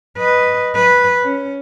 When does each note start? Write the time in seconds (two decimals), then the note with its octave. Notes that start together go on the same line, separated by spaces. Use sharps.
0.18 B4 D#5
0.76 B4
1.24 C#4